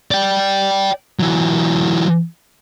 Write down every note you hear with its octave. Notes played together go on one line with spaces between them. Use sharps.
D5 G5
E3 F#3